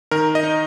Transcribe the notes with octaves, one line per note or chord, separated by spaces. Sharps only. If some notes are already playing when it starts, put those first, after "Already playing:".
D#3 A#4
D#5
D#4